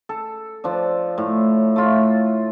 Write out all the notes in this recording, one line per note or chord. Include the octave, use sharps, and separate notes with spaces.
A4
F3 D4
A2
A3 F4